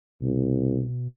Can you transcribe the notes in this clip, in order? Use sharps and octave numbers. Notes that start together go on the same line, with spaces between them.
C2 B2